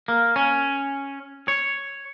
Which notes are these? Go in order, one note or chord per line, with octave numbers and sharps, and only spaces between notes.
A#3
C#4
C#5